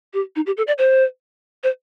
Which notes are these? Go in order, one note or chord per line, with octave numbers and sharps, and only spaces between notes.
G4
D#4
G4
A4
D5
C5
C5